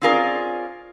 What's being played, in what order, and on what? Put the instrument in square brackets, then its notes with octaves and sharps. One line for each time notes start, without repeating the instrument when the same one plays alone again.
[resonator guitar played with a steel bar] C4 C#4 F4 G#4 A#4 D5